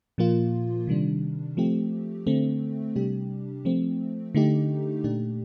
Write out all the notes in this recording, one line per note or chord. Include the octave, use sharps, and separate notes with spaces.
A#2 F3 A#3 F4
C3 D#3 G3 D4
F3 A3 C4 G4
D3 A3 C4
C3 G3 D4 G4
F3 A3 C4
D3 A3 D#4 G4
A#2 A3 D4 G4